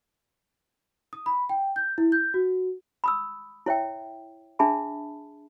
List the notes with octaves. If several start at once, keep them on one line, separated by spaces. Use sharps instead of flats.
D#6
B5
G5
G6
E4
G6
F#4
B5 D#6 E6
E4 C#5 E5 G5
D4 G#4 E5 A5 B5